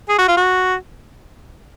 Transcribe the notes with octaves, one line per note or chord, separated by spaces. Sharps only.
G#4
F#4
F4
F#4